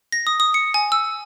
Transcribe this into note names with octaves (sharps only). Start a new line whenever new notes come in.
A#6
D#6
D#6
C#7
G#5
E6